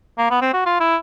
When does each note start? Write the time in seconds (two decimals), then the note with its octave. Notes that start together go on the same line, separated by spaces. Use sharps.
0.18 A#3
0.30 B3
0.41 C4
0.54 F#4
0.66 F4
0.80 E4